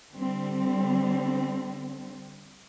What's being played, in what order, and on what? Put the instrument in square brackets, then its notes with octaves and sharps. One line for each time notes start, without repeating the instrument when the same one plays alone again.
[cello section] D3 G3 C4